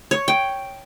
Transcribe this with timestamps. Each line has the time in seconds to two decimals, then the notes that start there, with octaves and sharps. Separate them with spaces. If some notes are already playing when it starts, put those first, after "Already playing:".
0.11 C#5
0.28 G5